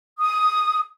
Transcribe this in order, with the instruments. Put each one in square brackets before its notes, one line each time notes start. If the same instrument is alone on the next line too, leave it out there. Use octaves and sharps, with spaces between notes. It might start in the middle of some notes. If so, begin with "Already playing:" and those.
[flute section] D#6